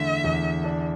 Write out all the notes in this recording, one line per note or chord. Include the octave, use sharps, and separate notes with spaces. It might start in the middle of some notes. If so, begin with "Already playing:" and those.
Already playing: E2 D3 A3 E5
E2
D4